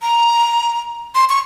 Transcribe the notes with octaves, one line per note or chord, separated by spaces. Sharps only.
A#5
C6
C#6